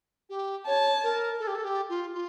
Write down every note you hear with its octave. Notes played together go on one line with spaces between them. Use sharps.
G4
C#5 A5
A#4
A4
G4
A4
G4
F4
F4